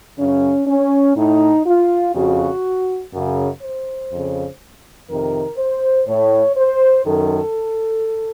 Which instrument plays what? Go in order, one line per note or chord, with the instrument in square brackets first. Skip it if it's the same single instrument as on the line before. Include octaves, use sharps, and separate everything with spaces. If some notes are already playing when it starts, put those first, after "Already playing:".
[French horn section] F#2 C#3 C#4
C#4
A2 D#4
F4
F2 C#3 F#4
F#2 C#3
C5
F2 C#3
F2 C3 D#3 A#4
C5
A2 C#5
C5
F#2 D#3 A4